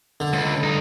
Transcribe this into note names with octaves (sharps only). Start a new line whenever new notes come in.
D3
C#2
G2 D#4